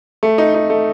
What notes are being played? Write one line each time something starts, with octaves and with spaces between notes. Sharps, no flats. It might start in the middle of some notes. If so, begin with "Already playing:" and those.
A3
D#4
D#4
A3